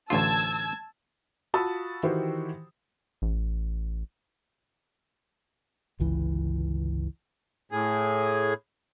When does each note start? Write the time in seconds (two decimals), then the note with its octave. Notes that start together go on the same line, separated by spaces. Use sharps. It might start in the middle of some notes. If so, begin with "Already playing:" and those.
0.10 A1 D2 F4 A5 E6 G#6
1.54 F4 F#4 A5 B5 D#6 E6
2.03 D#3 E3 F#4 G4 C5
3.22 A1
6.00 G1 C#2 E3
7.72 A2 G#4